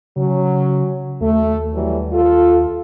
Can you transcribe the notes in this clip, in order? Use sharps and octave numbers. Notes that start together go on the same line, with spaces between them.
C#3 F#3 C#4
D#2 A3
E3 F#3 G3
F4 A4